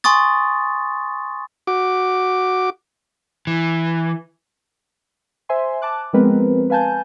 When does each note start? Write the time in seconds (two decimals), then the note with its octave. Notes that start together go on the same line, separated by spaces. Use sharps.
0.04 G#5 C6 C#6 D#6 A6
1.67 F#4 D6
3.47 E3
5.49 C5 E5 G#5 C6
5.82 A5 D6 F#6
6.13 F3 G#3 B3 C4 A#4 B4
6.70 B4 F5 G#5 A5 G6